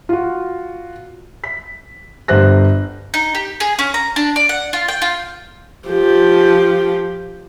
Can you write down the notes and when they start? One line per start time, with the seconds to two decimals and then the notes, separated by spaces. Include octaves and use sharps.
0.09 F4 F#4
1.44 B6
2.28 G1 G4 C5 F#6 A#6
3.14 D#4
3.35 G4
3.60 G#4
3.79 C#4
3.94 A#5
4.16 D4
4.36 D5
4.49 F#5
4.73 F4
4.88 G5
5.02 F4
5.89 F3 G4